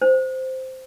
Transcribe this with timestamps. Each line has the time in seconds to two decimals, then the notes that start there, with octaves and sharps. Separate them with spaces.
0.02 C5